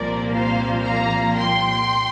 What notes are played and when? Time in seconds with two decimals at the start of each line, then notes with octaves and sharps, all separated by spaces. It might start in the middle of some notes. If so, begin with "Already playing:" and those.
Already playing: C2 A#2 F3 A#3 A#4 D5
0.31 C5 F5
0.83 F5 A#5
1.35 G5 C6